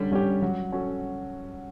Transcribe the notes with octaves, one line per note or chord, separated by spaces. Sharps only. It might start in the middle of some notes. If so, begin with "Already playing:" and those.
Already playing: D3 G3 C#4
G3 C#4 G4
F#3
C#4 F#4 A4